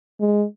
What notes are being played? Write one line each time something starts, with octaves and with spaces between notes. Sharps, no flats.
G#3